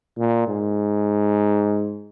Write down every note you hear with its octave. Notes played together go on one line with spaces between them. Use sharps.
A#2
G#2